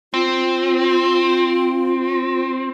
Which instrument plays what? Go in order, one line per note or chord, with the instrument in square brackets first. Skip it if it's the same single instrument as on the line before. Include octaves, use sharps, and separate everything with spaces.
[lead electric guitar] C4 [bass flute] F4